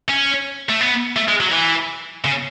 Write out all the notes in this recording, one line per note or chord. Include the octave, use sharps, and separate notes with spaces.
C#4
A3
B3
A3
G#3
F#3
E3
C#3